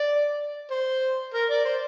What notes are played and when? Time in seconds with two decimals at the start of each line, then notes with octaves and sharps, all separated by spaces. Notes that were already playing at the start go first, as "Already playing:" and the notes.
Already playing: D5
0.71 C5
1.34 A#4
1.50 D5
1.65 C5